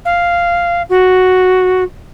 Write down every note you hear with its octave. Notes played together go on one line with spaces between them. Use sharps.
F5
F#4